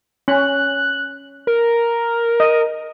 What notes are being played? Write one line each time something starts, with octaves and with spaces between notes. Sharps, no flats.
C#4 F#6
A#4
D#5